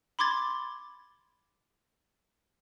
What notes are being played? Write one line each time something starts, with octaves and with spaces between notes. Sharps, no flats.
B5 C6 D6 G#6 A6